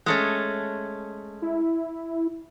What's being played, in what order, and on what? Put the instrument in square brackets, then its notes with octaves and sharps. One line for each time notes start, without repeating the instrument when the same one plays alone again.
[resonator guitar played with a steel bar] G#3 A3 C#4
[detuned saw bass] E4